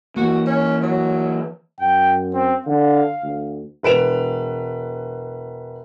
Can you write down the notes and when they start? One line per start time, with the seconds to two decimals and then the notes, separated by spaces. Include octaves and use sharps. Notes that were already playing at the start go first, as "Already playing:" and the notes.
0.16 E3 A#3 F#4
0.46 C#4
0.83 F#3
1.80 F#2 G5
2.34 C4
2.67 D3 F5
3.23 D2
3.83 E1 B4 D7 E7 F7